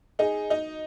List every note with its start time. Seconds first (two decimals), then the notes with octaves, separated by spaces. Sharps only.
0.19 D#4 G#4
0.50 D#4